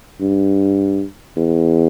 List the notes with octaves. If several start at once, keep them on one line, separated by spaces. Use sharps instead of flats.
G2
E2